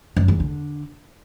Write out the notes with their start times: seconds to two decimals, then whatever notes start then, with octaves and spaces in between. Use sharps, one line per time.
0.16 F#2
0.28 E2
0.40 D3